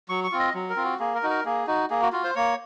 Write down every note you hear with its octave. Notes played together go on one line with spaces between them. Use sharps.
F#3 C#6
C#6
C4 F4
D#5
F#3
A#4
C4 F4
F#4
A#3 G#4
A#4
D#4 F#4
A#4
A#3 G#4
D#4 F#4
A#3 G#4
F#4
F4 F#4
C5
A#3 C#5